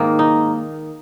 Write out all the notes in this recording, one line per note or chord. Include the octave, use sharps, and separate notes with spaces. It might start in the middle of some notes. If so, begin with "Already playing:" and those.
Already playing: G#2 D#3 A#3
D#4